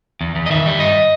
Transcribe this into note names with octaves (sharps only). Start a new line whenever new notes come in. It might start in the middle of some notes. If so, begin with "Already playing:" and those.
E2
E2
D#5
D#3 E5
G3
G2 D#5